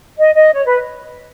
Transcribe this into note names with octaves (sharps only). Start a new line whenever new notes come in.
D#5
D#5
C#5
B4